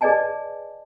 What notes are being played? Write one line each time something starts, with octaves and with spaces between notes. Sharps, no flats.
G#4 B4 D5 D#5 G#5 A5